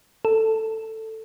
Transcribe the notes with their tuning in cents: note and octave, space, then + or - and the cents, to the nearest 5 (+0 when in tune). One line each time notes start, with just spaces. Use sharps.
A4 +10